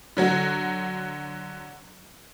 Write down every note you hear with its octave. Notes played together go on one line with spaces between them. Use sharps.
D3 F#3 F#4